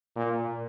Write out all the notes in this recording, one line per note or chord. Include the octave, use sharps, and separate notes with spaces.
A#2